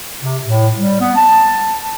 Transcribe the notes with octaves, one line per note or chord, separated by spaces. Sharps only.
C3
A2
G3
B3
A5